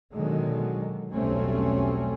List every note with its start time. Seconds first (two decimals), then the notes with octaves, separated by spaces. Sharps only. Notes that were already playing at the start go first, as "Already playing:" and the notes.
0.14 B2 D3 D#3 F#3 G#3
1.13 B1 E2 G3 A3 C4 C#4